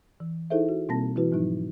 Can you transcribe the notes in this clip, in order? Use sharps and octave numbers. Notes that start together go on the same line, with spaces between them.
E3
D#4 E4 G#4 A4 C5 E5
F#4
B2 G3 A#3 C4 A5 A#6
E3 E4 F#4 B4
G#2 F3 F#3 D#4